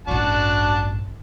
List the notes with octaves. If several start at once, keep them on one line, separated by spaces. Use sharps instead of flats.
A1 G2 D4 F#4 A5